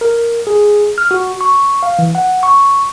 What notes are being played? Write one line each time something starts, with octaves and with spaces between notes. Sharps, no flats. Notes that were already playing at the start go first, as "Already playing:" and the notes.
A#4
G#4
F6
F#4
C#6
F5
E3
F#5
C#6